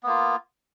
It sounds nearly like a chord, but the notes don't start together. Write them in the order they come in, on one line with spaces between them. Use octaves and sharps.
B3 A#3 F4